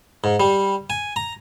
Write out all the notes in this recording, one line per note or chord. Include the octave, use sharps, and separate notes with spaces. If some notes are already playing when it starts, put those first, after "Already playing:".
G#2
G3
G#5
A#5